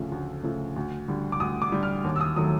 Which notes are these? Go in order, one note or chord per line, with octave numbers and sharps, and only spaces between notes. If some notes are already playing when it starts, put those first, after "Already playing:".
Already playing: D2 C#3 F3 A3
D2
C#3 F3 A3
D2
D3 G3
D6
D2 D#6
D6
D3 G3
F6
D#2
E6
D#6
D#3 F#3 A3 D#6